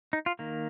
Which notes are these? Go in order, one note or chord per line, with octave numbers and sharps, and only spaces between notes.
D#4
F4
D#3 A#3